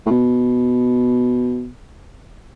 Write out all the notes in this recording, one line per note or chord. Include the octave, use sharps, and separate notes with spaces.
A2
B2